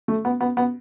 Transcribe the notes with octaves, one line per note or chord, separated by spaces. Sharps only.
A3
B3
B3
B3